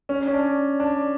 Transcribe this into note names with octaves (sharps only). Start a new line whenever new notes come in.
C#4
C#4
D4
D4